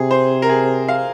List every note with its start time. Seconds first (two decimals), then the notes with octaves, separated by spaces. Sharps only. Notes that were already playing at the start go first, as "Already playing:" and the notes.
Already playing: C3 G#4
0.11 C5
0.42 A#4
0.49 G#4
0.88 F5